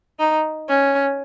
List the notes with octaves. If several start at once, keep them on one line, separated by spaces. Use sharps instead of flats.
D#4
C#4